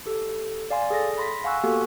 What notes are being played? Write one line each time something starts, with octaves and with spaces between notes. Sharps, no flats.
G4 A4
D5 F5 G#5 C6
G#4 A4 A6 A#6
B5 C6 A#6 B6
F5 F#5 G#5 C#6 E6 F#6
A#3 B3 F#4 G4 A4